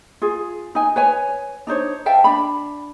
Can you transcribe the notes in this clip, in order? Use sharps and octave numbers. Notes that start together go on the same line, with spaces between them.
F4 G#4
D#4 G#5
B4 C#5 G#5
D4 D#4 C5 C#5
E5 F5 G5 A5
D4 B5